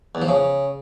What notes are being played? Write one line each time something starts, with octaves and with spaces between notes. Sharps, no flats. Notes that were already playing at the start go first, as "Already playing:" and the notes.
E2
F3
C#3